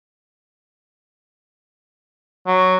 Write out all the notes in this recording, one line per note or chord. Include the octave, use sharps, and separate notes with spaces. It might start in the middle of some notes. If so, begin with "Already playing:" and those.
F#3